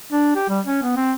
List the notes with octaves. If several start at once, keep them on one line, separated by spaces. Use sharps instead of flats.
D4
G4
G3
C#4
B3
C4